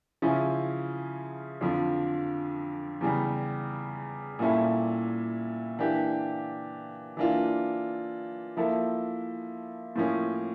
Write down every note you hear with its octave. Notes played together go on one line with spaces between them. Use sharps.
C#3 F3 C#4 E4
F2 D3 F3
E2 C#3 G3
A#2 G3 C#4 E4 A4
E3 A#3 D4 G4
E3 A#3 D4 F4
F3 A#3 E4 A4
A2 F3 A#3 C#4